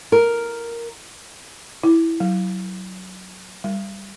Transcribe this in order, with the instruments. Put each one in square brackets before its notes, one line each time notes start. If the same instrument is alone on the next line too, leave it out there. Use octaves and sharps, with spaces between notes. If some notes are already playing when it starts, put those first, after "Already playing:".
[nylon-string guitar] A#4
[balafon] E4
F#3
G3